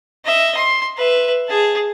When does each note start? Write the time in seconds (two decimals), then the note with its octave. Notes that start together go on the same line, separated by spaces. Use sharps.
0.25 D#5 E5
0.57 C6
0.97 B4 E5
1.48 G#4 A5